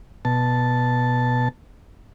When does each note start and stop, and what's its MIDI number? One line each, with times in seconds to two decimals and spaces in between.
0.25 1.48 47
0.25 1.48 81